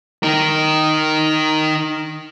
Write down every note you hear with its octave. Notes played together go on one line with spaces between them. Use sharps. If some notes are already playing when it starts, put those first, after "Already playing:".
D#4 A#4